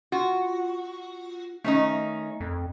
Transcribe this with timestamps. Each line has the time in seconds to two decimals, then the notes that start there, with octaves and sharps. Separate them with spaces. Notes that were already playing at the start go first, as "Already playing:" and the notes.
0.12 F4 F#4
1.64 D#3 A3 C#4 D#4
2.40 F2